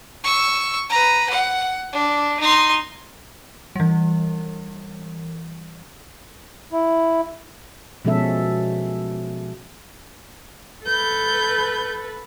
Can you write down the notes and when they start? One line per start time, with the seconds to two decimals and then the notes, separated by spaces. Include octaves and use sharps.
0.24 C#6 E6
0.90 B4 A#5
1.30 F#5
1.92 D4
2.40 D#4 C6
3.76 E3 G3
6.72 E4
8.05 B2 F3 G#3 C#4 A4 E5
10.86 A4 B4 G6